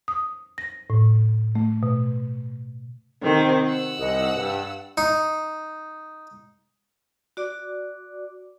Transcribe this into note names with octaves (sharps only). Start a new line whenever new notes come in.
D#6
A#6
A2
A3
B2
C3 D#3 C4
F#5 E6
C2 D#5
G2
D#4
F#4 D5 D6